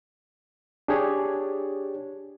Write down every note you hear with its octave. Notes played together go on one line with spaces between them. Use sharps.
D4 G4 G#4 C#5